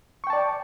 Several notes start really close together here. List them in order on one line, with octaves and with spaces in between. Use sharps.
C#6 G5 A5 D5